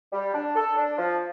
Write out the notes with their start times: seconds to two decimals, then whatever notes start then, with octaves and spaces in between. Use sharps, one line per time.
0.13 G3
0.33 D4
0.55 A4
0.76 D4
0.98 F3